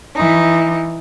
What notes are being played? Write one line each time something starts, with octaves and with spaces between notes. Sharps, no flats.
E3 D#4